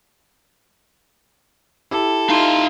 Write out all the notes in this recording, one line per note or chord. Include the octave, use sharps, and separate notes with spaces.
E4 G4 A4
D#4 E5 F5 C6